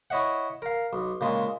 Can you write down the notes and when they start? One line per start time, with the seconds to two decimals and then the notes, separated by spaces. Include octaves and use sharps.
0.10 E4 C#5 D#5 E5 F#5
0.62 A#4 F5
0.93 B1
1.21 A#2 C#3 G#3